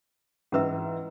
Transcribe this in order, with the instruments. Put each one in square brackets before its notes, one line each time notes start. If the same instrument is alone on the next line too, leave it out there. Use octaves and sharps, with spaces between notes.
[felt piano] G#2 E3 E6 [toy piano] C#4 B4 E5